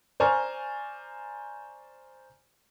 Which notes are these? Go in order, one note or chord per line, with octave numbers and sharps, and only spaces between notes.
C5 D5 G#5 A#5 C#6 F6